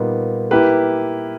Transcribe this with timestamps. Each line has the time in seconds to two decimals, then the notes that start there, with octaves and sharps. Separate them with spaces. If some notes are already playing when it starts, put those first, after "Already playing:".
Already playing: A#2 G3 B3 D#4
0.51 A#3 E4 G4 B4